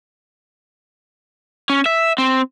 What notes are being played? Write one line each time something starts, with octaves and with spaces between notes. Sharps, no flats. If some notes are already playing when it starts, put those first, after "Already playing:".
C#4
E5
C4